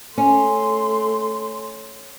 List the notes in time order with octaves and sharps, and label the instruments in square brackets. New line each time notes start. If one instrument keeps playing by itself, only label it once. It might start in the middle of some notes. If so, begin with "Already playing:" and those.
[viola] A3 C6 [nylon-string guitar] C#4